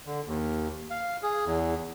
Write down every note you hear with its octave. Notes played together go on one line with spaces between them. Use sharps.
D3
D#2
F5
G#4
E2